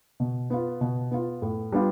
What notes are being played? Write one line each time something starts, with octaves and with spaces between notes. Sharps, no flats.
B2
B3 F4
B2
B3 F4
A2
G3 B3 D4 F4